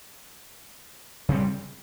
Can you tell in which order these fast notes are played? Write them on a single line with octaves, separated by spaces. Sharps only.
C#3 C4 G3